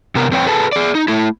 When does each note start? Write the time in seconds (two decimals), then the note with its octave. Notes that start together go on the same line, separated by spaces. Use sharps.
0.15 C3 B3 A#4
0.31 F2 C4 B4 C#5 G5
0.47 G#4 A4 B4 A5
0.72 G#4 D5
0.95 D#4
1.08 A3 E4